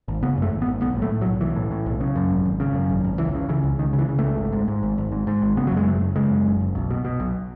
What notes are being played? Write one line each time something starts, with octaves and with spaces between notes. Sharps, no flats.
G#1
C#3 B3
F#2 A3
G#1
B3
G#1
B1 B3
A2
A3
A2
F#3
B1
B1 E3
A2
A2
B1
C#3
F#2
G#1
G#1
C#3
F#2
G#1
G#1
C#2 E3
C#3
C#3 E3
C#2
C#2 D#3
C#3
E3
C#3
C#2 A3
G#1
G#2
G#2
G#1
G#1
G#2
G#2
G#1
C#3 B3
F#3
F#2 G#3
F#1 A3
F#1
C#3 G#3
F#2
F#1
F#1
B1
B2
B2
B1